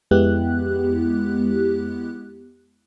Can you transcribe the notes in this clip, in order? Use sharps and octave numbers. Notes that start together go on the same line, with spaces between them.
F2 G#3 B3 E4 G4 F#6